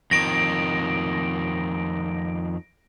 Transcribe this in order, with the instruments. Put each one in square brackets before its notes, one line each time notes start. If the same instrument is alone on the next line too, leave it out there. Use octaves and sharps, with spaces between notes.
[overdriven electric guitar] F2 D#3 [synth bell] A#6 D7